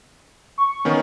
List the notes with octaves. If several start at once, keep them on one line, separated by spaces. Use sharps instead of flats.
C#6
D#3 B3 C#4